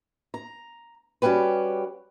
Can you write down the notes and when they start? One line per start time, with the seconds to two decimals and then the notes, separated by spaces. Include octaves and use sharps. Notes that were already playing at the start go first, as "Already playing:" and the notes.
0.34 A#5
1.22 G3 C#4 F#4 G4 B4